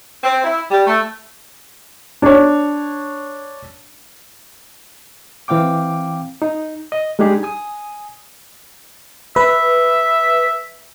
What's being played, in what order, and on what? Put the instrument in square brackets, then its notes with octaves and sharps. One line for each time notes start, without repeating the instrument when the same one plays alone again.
[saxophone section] C4
E4
G3
A3
[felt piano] D4 C#5
[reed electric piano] E3 C4 F5 G5 D6
D#4
D#5
G3 G#3 D4 D#4 G4 G#4
G#5 D#6
[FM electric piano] B4 [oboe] E5